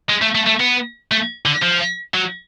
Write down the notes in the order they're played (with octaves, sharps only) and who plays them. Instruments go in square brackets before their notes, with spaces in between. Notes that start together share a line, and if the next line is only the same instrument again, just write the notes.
[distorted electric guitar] G#3
A3
A3
A3
B3
A3
D3
F3
F#3